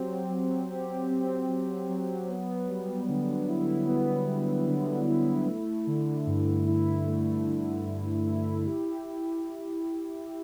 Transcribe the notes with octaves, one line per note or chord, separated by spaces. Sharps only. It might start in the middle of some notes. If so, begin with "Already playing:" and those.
Already playing: F#3 C4 G4
F#3
G4
C4
F#3
F#3
B3
G3
D3
E4
B3
G3
D3
E4
A3
D3
G2
E4
A3
D3
G2
E4
G4